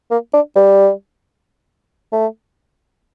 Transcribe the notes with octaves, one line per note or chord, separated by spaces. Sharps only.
A#3
D4
G3
A3